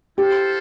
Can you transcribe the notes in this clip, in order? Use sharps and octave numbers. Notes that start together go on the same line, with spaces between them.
E4 G4 A4 C5 F5